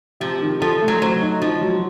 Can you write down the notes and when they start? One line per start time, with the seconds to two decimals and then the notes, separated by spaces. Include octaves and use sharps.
0.20 C3 F3
0.41 D#3
0.61 F3 A4
0.81 A3
0.88 F#3
1.02 F#3 C5
1.21 D#4
1.41 F3 D#4
1.61 F#3